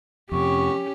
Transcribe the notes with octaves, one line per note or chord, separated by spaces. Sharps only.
F2 C3 C#4 G4 C#6